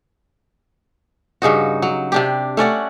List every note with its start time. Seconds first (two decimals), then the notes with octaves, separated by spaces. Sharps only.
1.42 G2 C#3 D#4 F#4
1.82 F#3
2.12 C3 D4 G4
2.57 A3 C#4 D5 F#5